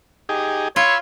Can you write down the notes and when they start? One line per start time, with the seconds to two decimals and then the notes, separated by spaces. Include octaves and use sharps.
0.29 D#4 G4 G#4
0.76 F4 C#5 B5 C6 E6